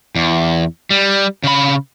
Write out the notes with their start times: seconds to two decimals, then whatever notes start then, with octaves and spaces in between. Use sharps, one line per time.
0.15 E2
0.91 G3
1.44 C#3 B5